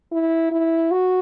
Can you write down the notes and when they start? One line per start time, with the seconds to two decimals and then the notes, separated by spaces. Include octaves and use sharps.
0.12 E4
0.51 E4
0.91 F#4